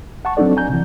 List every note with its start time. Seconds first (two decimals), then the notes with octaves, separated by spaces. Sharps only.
0.25 F#5 A5 C#6
0.37 F#3 C4 D4 D#4 A4 D5
0.57 G#5 A#5 G6
0.69 C3 E3